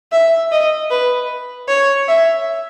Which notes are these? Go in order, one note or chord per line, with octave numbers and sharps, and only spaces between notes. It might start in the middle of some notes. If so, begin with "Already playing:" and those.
E5
D#5
B4
C#5
E5